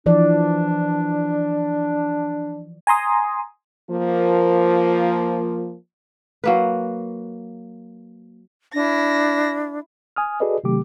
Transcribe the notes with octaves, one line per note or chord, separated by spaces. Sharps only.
E3 F3 D4 D5
G#5 A#5 C6 D#6
F3 A#3
F#3 A#3 B4
D4 E4 A#6
G#5 D#6 F6
F#4 G#4 A4 B4 D5 D#5
C3 D#3 F#3 A3 G4 D6